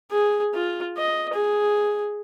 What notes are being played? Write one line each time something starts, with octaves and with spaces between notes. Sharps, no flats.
G#4
F4
D#5
G#4